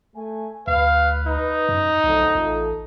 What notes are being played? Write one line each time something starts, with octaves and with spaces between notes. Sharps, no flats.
A3 G#5
D2 B4 F5
D#4
F#2
B1 F2 A2 D3
A1 A3 F4 A4